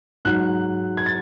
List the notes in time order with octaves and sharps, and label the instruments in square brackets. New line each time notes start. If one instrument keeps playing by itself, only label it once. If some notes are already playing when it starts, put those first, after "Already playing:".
[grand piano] G#2 F#3 F#6
G#6
A6